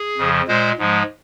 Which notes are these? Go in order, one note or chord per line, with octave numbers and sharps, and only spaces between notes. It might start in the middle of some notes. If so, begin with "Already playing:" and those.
Already playing: G#4
F2 C#3 F3
A#2 G#3 C5
G#2 F3 G#3